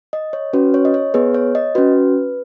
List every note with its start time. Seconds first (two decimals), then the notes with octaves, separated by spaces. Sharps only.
0.13 D#5
0.33 C#5
0.53 C#4 F#4 B4
0.74 C#5
0.85 D#5
0.94 C#5
1.14 B3 G#4 B4
1.35 C#5
1.55 D#5
1.75 C#4 F#4 B4